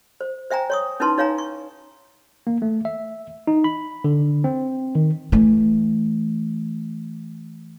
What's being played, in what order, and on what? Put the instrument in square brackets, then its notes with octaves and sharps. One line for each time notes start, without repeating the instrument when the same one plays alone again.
[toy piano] C5
C5 E5 G5 G#5 A#5
C#5 C#6 D#6
C#4 D#4 E4 B4 A5 C6
D#4 C#5 F5 G#5 A#5
C#6
[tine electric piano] A#3
A3
E5
D#4
B5
D3
C4
D#3
[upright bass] E3 A3